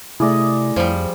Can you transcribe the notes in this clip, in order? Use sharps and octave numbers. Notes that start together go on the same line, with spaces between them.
C3 A3 E4 G#4 D5 D#5
F2 F3 G3